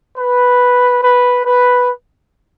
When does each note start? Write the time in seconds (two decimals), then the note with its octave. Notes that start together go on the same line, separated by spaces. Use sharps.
0.18 B4
1.02 B4
1.46 B4